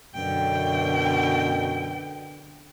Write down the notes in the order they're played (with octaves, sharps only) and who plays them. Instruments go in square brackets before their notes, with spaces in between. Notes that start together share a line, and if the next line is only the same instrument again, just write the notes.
[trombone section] F#2 B2 [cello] D3 G5